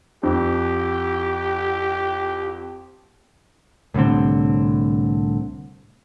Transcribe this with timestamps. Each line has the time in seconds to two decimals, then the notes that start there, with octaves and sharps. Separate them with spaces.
0.23 F2 G4
3.94 C2 A2 D3 C4